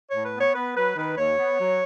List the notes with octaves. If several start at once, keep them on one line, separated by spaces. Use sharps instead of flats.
A2 C#5
B4
B3 C#5
B3 B4
F#3 B4
D#3 B4
D#2 C#5
B3
F#3